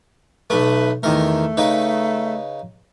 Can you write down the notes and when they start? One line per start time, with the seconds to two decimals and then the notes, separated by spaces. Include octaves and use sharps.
0.50 B1 A3 B4
1.03 E2 D#3 A3 A#4
1.57 C#3 D#4 B4